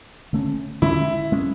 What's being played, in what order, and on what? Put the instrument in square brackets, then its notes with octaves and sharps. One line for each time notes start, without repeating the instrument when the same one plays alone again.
[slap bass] D3 A3 C#4
[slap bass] D3 G#3 C#4 [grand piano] E4
[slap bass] G#3 C#4